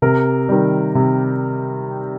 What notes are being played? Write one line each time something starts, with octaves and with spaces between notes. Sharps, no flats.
C3 A#4
D#3 G3
C3